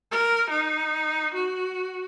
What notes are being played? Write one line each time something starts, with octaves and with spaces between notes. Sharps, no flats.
A#4
D#4
F#4